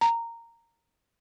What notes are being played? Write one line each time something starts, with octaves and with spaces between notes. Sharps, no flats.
A#5